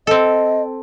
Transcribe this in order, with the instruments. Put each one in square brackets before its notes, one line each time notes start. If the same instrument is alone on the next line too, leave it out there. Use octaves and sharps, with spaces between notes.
[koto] C4 A4 [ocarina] D#5